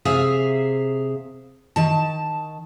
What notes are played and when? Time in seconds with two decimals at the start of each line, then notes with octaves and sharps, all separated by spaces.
0.05 C3 G#4 E5 F5
1.76 D#3 A5